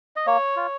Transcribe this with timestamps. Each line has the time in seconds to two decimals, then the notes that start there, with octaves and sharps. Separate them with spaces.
0.16 D#5
0.27 A#3 C#5
0.56 F4